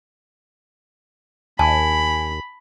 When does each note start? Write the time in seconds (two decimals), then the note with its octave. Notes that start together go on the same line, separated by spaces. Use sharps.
1.59 D#2 G#5 A5 B5